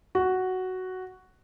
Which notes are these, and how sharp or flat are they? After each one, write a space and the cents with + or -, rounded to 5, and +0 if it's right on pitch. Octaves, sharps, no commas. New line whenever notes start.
F#4 +5